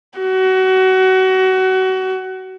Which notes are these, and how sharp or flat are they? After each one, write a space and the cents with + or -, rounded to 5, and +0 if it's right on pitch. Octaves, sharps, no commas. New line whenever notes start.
F#4 +25